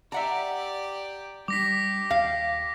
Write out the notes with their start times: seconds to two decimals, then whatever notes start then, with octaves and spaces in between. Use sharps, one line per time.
0.12 G4 D5 E5 F#5 A#5
1.48 G3 G#3 D4 G4 D6 A#6 B6
2.10 D#2 F5